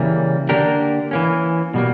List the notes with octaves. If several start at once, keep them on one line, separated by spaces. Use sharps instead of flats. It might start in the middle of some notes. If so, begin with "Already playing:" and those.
Already playing: C#3 E3 G3 A#3
D3 A#3 D4 G4 A#4
E3 A#3 C#4
B2 G3 A#3